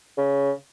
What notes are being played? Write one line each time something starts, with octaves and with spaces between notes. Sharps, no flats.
C#3